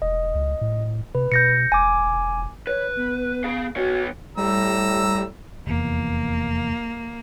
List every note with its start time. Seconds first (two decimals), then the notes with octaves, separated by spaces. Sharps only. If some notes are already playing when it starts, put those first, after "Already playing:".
0.02 E1 D#5
0.35 C#2
0.61 A2
1.15 C3 B4
1.32 B2 G6 A#6 C#7
1.72 E1 G#5 D6
2.67 B4 C#5
2.96 B3
3.44 G#4 F5
3.76 B3 F#4 C#5
4.37 A2 G3 A#5 E6
5.67 F1 E2 A#3